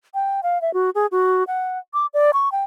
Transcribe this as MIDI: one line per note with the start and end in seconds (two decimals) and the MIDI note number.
0.14 0.40 79
0.43 0.61 77
0.62 0.73 76
0.74 0.90 66
0.95 1.06 68
1.12 1.44 66
1.47 1.79 78
1.94 2.06 86
2.14 2.31 74
2.34 2.52 85
2.52 2.64 79